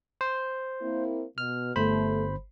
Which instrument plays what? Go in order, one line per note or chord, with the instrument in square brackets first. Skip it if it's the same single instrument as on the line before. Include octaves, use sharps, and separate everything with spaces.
[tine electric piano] C5
[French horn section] A#3 C4 E4
[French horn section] B2 [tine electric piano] F6
[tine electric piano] G1 C5 B5 [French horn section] A3